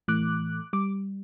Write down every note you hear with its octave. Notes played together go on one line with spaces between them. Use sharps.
A2 E3 A3 D6 F#6
G3 D6